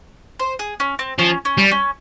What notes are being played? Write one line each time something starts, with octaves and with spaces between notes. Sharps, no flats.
C5
G#4
C#4
C4
F3 C#4
C#4
G3
C#4